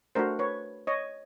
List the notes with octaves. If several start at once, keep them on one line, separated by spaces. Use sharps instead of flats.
A3 D4 F#4 A#4 C5
B4 C#5
C#5 D#5